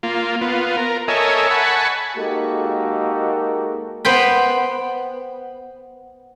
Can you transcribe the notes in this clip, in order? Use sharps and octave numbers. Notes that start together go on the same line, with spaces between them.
A#3 F4
B3 F4
A#4
A4 A#4 C#5 D#5 E5 G#5
F#5 G#5 A5 B5 C#6
G#3 A#3 D#4 F#4 G4 A4
B3 C5 G5 B5